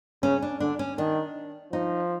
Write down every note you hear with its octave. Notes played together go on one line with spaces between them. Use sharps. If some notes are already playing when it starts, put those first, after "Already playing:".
C#3 C#4
D4
D3 D4
C#4
D#3 D4
F3 D#4